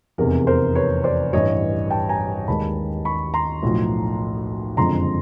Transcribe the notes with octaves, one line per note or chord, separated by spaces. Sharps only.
F1 E2 C3 G#4 A#4
A#4 C5
B4 C#5
C5 D5
A1 G2 E3 G3 C#5 D#5
G5 A5
G#5 A#5
D#2 D#3 G#3 A5 B5
B5 C#6
A#5 C6
B1 A2 F3
F#1 F2 D3 F3 G#3 A#5 C6